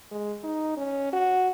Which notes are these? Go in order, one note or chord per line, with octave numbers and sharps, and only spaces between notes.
G#3
D#4
C#4
F#4